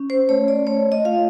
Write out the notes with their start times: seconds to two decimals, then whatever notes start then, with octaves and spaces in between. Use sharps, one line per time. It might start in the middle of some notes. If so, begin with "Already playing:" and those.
Already playing: C#4
0.10 C5
0.29 A3 C#5
0.48 D5
0.67 A3 C#5
0.92 D#5
1.05 F4 F5